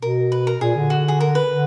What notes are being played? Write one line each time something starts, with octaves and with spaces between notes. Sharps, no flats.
B2 A#4
B4
A#4
A#2 G#4
D3
F#4
G#4
A#4
B4
D3